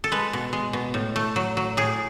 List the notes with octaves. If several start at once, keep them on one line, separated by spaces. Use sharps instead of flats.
A4
G#3 B4
B2
G#3
B2
A2
A3
F#3
F#3
A2 G#4